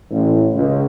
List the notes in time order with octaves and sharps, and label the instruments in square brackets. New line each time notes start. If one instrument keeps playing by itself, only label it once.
[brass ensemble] A1
C#2